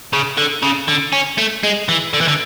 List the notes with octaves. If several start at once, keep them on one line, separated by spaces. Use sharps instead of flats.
C#3
D3
C#3
D3
C#4
A3
G#3
E3
D3
E3
D3